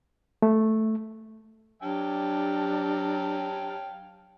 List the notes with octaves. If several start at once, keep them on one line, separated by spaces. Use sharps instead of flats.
A3
F#3 D4 G4 F5 G5 A5